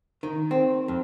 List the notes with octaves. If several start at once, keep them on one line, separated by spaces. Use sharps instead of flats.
D#3
C4
F2